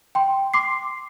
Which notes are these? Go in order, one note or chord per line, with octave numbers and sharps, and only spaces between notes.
G5 C6
C6 D6 C7